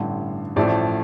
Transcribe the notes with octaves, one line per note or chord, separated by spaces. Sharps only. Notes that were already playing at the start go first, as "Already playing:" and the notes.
Already playing: A1 G2 D3
A1 A2 F3 A3 D5